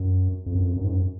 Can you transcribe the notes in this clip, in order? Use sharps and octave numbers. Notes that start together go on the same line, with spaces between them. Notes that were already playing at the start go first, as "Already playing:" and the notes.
Already playing: F#2
F2
F#2
F2
F#2
G#2
F#2